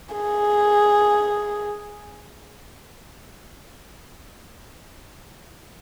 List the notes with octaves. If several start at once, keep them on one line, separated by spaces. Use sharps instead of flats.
G#4